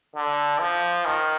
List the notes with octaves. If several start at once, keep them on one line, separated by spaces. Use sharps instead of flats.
D3
F3
D#3